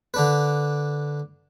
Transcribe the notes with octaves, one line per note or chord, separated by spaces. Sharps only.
D3 D4 B4